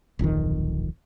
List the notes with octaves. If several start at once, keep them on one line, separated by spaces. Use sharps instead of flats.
D1 A#1 F2 D#3